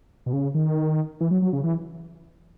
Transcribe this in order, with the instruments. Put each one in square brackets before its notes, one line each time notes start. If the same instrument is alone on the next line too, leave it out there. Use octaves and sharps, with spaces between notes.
[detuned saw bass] B2
C#3
D#3
E3
F#3
F#3
C#3
E3